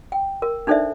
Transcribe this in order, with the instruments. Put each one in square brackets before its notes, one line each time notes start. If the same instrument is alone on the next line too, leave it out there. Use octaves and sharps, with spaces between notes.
[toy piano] G5
A#4
D4 D#4 A4 C5 D5 E5